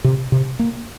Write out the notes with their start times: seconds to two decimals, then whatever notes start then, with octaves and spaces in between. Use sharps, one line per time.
0.04 C3
0.32 C3
0.59 A#3